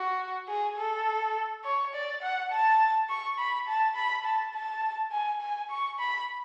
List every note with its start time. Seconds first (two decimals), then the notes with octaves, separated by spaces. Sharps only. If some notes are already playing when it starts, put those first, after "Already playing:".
Already playing: F#4
0.48 G#4
0.78 A4
1.65 C#5
1.94 D5
2.22 F#5
2.52 A5
3.09 C#6
3.39 B5
3.67 A5
3.96 B5
4.25 A5
4.54 A5
5.12 G#5
5.41 G#5
5.70 C#6
5.99 B5